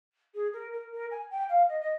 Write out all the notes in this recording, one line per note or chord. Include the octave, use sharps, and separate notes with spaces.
G#4
A#4
A#4
A#4
G#5
G5
F5
D#5
D#5